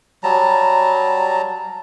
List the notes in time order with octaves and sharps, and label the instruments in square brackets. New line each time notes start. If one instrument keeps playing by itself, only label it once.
[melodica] F#3 G3 A5 A#5